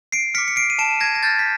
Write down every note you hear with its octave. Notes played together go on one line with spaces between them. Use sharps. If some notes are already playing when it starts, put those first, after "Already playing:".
C7 D7
D6 F6 B6 C#7
C#7
C7 D7
D#7
A5 D7 E7
G#6 A#6
A#6
C6 F6 G6 A6
B6